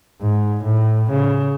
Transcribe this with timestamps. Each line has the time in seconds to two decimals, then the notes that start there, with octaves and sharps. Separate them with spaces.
0.22 G#2
0.64 A2
1.11 C#3